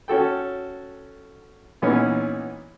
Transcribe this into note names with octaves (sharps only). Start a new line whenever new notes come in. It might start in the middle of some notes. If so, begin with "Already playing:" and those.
C#4 F#4 A4 G5
A#2 E3 B3 C#4 D#4